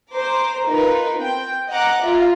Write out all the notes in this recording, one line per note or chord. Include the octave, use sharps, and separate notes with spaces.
C5 A#5 D6
D#4 F4 A#4 B4
C4 G5
D#5 F#5 A#5 D6 F#6
F4 E5 A#5